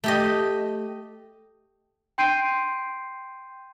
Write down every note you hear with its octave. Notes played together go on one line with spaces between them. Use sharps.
A3 G4 D#5
G5 C6 G6 C7 D7 D#7